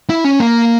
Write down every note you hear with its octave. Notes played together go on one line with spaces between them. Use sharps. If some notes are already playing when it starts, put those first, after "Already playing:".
E4
C#4
A#3